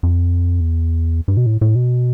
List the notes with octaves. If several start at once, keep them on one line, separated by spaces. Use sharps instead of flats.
F2
E2
G2
B2
A2
A2
B2